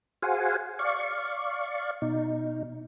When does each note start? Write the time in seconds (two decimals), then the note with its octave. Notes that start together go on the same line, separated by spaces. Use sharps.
0.22 F#4 G#4 C5 F5 F#5 G#5
0.79 D5 F5 C#6
2.02 B2 D#4